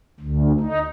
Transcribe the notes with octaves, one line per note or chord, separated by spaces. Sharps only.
D2
D#4